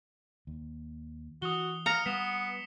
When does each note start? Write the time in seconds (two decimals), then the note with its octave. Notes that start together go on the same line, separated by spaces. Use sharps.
0.47 D#2
1.42 E3 F#4 D#6 G7
1.86 F5 A#5 C#7 F7
2.06 G3 B3 B6 E7 G7